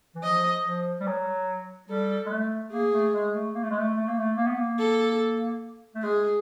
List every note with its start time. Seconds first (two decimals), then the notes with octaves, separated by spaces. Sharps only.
0.15 E3
0.23 F3 D#5
0.65 F3
1.00 G3
1.07 F#3
1.89 G3 A4
2.26 G#3
2.31 A3
2.72 A#3 G#4
2.92 A3
3.14 G#3
3.35 A3
3.55 A#3
3.63 A3
3.71 G#3
3.78 A3
3.96 A3
4.08 A#3
4.18 A3
4.37 A#3
4.47 B3
4.56 A#3
4.79 A4
5.95 A3
6.03 G#3 G#4